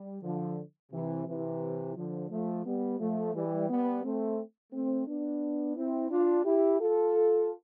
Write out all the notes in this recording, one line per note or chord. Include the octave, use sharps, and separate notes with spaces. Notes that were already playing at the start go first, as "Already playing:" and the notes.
Already playing: G3
D3 F3
C3 E3
C3 E3
D3 F3
F3 A3
G3 B3
F3 A3
E3 G3
G3 B3
A3 C4
A3 C4
B3 D4
C4 E4
D4 F4
E4 G4
F4 A4